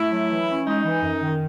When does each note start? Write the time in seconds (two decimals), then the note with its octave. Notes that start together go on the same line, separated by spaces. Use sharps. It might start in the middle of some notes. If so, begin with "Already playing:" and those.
Already playing: A3 E4
0.11 F#3
0.30 E3
0.48 C#4
0.66 G#3 D#4
0.84 E3
1.03 F#2
1.22 D#3